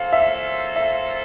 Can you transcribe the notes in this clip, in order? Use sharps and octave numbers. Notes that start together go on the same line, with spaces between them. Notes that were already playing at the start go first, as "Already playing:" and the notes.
Already playing: A#3 C#4 F4 A4 C5 F5
E5
E5